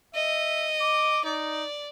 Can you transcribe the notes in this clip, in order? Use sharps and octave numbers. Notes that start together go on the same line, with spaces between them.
D#5 E5
D6
D#4 D5